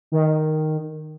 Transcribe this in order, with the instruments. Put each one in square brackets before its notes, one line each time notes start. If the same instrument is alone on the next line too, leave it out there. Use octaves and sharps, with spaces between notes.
[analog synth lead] D#3